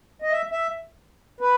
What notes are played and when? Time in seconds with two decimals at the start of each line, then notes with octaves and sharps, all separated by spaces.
0.22 D#5
0.32 E5
0.52 E5
1.41 B4